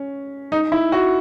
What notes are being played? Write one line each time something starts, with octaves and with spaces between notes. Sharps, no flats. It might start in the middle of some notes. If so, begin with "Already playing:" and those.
Already playing: C#4
D#4
E4
F#4